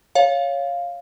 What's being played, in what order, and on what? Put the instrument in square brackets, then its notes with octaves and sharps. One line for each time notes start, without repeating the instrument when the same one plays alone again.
[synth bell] C#5 F5